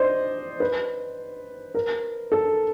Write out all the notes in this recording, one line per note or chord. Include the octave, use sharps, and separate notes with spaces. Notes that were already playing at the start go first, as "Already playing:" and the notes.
Already playing: C5 D5 D#5
B4
A#4
A4